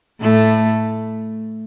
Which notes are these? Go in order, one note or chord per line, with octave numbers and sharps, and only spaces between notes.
A2 A3